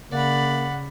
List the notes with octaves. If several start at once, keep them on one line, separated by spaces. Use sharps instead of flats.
C#3 A#3 D5 F#5 B5